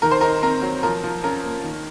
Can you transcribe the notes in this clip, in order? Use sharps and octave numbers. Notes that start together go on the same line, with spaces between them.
D#3 A#4
C5
D#4 A#4
C4 A#4
F#3
F3 A#4
F3
C#4 A#4
A#3
D#3